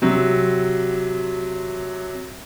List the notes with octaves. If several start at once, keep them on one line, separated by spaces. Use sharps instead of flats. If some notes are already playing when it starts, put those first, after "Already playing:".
C3 F#3